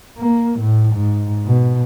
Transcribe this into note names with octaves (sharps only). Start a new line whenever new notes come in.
A#3
A2
G#2
B2